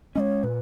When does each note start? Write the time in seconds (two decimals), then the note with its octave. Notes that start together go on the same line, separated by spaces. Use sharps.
0.15 G#3 C#4 C#5 D#5
0.43 A#2 B4